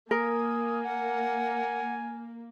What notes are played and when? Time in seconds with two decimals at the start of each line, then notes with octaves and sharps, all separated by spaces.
0.11 A#3 A#4 G#5 D#6
0.83 F#5